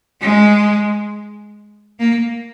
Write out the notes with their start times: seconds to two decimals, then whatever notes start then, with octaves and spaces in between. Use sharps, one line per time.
0.21 G#3
2.00 A#3